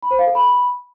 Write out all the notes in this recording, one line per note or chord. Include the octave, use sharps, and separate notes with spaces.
B5
C5
F5
A4
B5